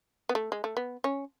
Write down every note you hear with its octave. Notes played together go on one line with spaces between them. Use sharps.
B3
A3
G#3
A3
B3
C#4